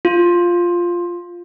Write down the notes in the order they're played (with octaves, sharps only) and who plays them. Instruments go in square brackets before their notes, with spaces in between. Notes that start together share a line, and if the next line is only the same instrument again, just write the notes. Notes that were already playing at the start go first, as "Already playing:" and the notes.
[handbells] F4